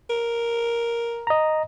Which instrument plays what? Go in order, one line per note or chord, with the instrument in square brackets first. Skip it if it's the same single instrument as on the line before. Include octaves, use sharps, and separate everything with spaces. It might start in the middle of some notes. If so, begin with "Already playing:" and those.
[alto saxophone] A#4
[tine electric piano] D#5 A#5